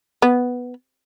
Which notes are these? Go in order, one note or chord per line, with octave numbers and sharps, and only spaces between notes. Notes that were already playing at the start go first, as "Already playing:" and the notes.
B3